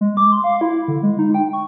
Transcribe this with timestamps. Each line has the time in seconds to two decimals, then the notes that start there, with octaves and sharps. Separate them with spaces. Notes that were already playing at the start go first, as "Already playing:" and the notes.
0.01 G#3
0.17 D6
0.32 C6
0.44 F5
0.61 E4
0.88 D3
1.03 G#3
1.19 D#4
1.34 G5
1.53 C#6